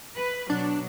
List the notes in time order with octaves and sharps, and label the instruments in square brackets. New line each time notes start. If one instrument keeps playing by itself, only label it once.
[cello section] B4
[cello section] B2 F#3 [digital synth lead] D4